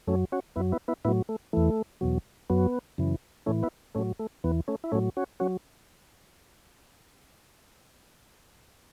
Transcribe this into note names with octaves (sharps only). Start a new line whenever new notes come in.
F#2 F#3 A3 C#4
C#4 F#4
F#2 F#3 B3 E4
B3 E4
B3 E4
A2 F#3 B3 E4
A3
E2 E3 A3
E2 B2 F#3
F#2 F#3 B3
F#2 C#3 E3
A2 E3 A3 C#4
B3 E4
A2 F#3 A3 C#4
A3
E2 E3 B3
A3 C#4
E4
A2 F#3 A3 C#4
C#4 F#4
F#3 C#4 F#4